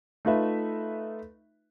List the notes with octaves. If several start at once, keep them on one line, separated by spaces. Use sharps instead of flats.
A3 D#4 F4 B4 E5